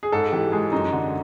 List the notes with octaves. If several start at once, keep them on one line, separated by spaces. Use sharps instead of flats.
G#4
G#2 A4
E3 G4
G#3 G#4
F#2 D#4
D3